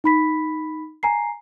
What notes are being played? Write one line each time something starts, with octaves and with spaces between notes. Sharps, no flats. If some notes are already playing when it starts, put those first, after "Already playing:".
D#4 B5 B6
G#5 A#5 C7